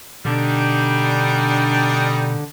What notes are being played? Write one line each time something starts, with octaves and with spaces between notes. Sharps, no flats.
B2 D3 G3 D4 D#4